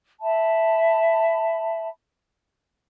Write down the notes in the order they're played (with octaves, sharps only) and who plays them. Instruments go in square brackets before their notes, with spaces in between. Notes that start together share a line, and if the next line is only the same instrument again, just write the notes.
[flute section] E5 A5 B5